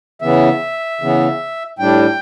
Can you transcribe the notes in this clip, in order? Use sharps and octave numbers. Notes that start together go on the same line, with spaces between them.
C#3 E3 B3 E5
C#3 E3 B3
A2 G3 D4 G5